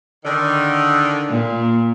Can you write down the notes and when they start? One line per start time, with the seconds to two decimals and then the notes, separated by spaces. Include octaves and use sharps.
0.24 D3 D#3
1.29 A#2